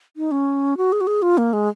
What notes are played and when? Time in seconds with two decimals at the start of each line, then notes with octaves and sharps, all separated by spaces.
0.17 D#4
0.31 C#4
0.77 F#4
0.92 G#4
1.01 F#4
1.07 G#4
1.22 F4
1.38 A#3
1.53 G#3